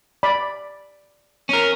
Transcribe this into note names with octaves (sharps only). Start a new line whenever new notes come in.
D5 B5
C#4 A#4